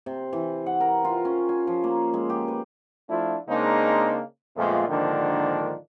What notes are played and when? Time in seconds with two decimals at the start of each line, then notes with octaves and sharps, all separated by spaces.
0.06 C3
0.33 E3
0.66 F#5
0.80 A#4
1.04 F4
1.25 C#4
1.49 G#5
1.67 F3
1.84 A#3
2.13 G#3
2.29 G4
2.48 B4
3.09 F3 A3 D4 E4 F4
3.48 C#3 G#3 A#3 C4 D4 D#4
4.57 F2 A#2 G#3 A3 B3 F4
4.88 G#2 D3 D#3 F3 A#3 D4